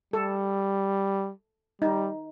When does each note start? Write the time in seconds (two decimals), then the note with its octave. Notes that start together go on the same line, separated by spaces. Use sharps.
0.13 G3 A4
1.82 G3 D#4